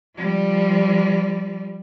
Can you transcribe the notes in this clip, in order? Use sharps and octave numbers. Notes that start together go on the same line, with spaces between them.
F3 G3